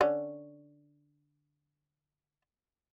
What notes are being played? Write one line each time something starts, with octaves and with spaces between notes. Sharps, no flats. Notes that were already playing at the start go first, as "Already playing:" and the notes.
D3 C#4